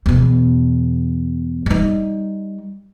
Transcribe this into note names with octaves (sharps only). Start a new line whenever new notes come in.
E2 B2
G3 D#4